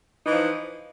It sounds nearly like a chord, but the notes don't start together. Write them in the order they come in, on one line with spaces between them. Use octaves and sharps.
D#4 E3 F3